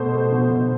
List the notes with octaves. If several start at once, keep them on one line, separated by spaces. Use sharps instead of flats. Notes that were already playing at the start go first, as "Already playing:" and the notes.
Already playing: B2 A3 C5
A3
B2
B2